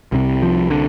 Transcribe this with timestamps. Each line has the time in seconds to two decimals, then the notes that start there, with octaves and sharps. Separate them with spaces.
0.12 C2 C3
0.42 F3
0.70 D3